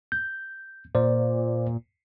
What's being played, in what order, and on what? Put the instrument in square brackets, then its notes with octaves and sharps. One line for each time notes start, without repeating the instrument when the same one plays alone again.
[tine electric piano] G6
[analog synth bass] A#2 [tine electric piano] C5 D5